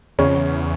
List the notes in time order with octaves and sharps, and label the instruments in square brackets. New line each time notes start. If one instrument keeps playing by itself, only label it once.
[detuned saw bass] E2 [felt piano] C#3 C#4
[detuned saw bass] F2
E2